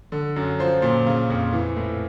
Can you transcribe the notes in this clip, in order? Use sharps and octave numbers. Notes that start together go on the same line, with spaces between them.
D3
F#2
F3 C5
A#2
C#3
F2
E3
A2